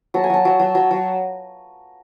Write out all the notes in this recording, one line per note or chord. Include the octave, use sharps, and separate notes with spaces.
F#3 A5
G#5
F#3 A5
F#3
F#3
F#3
F#3